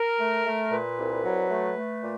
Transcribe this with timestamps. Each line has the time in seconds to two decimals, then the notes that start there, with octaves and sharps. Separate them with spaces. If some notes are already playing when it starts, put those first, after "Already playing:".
Already playing: A#4
0.19 A3
0.46 A3
0.71 A#2 B4
0.98 C2
1.24 F#3
1.50 A3
1.76 A3
2.03 A#2